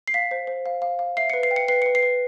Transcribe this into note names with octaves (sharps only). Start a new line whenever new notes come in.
C7
F5 B6
C5
C5
F5
F5
F5
E5 C7
B4 C#7
C7
G5
C#7
B4 C7
B4 C#7
C7
B4